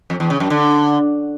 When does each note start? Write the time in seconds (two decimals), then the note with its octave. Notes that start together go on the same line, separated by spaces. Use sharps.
0.10 F2
0.20 E2
0.30 C#3
0.40 F#2
0.50 D3